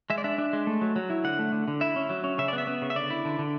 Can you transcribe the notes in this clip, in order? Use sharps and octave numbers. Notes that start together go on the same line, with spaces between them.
G#3 E5
D5
D4 E5
D4
G#3
A3
F#3
F#3
E4
D3 F#5
A3
D3
D3
E4 E5
C#4
F#3
C#4
C#3 E5
D5
B3
E5
B3
C#3
E5
D3 D5
E4
D3
D3